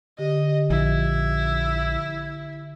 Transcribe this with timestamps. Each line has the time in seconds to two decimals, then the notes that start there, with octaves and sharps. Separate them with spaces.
0.19 D3 G4 D#5
0.70 A#1 F3 E4